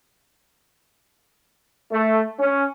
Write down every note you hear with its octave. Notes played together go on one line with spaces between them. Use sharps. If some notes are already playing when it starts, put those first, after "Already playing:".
A3
C#4